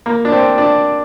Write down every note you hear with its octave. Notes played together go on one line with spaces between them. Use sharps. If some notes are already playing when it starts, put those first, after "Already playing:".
A#3
D4
C4
D4